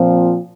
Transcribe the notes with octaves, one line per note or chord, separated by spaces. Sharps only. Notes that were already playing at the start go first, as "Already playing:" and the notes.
Already playing: A#2 F3 C4